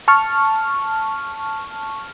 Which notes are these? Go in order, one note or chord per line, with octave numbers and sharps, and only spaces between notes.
A5 C#6 F6